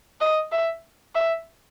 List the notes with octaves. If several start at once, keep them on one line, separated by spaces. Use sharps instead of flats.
D#5
E5
E5